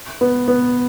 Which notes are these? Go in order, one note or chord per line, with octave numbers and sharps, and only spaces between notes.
B3
B3